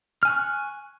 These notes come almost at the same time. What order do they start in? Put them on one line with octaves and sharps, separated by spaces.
F6 G#5 F#6 C#6